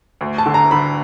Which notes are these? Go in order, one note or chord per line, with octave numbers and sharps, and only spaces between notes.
D2
A5
D3
A#5
D3 B5